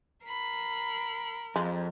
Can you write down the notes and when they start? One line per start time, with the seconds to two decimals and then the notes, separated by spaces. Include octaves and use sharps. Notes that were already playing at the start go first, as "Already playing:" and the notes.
0.25 A#4 B5 C7
1.56 F2 G#3